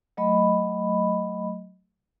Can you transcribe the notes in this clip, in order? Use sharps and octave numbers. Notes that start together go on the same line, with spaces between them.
F#3 A3 D#5 B5